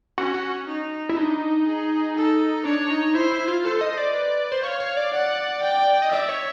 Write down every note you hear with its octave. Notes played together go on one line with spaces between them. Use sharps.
C#4 F#4
F#4
D#4
E4
D4 D#4
G#4
A4
D4 C#5
D#4
E4 C5
E4
F4
A4 C5
D#5
D5
B4
C5
C#5 F5
C#5
D5
F#5
G5
D#5
D5 E5
C#5